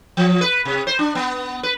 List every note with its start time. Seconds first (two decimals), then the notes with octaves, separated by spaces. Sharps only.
0.17 F3
0.41 B4
0.65 C3
0.87 C5
0.99 D4
1.15 B3
1.63 B4